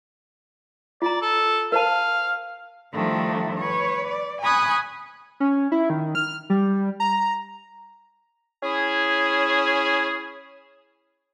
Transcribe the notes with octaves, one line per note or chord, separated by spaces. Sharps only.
F4 D5 A#5
A4
A#4 C5 F5 A5
D#3 F3 G3 A3 D4 E4
B4 C#5
D5
G#5 B5 C#6 D#6 F#6
C#4
E4
D#3
F6
G3
A#5
C#4 E4 G#4